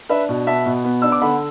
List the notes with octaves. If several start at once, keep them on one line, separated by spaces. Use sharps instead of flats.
D4 B4 E5
B2
B3 E5 A5
B2
B3
D4 E6
D6
D3 F#5 B5